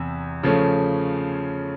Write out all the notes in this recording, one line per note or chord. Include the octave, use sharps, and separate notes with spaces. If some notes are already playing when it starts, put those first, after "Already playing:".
Already playing: E2 C3
C#3 F3 A3 C#4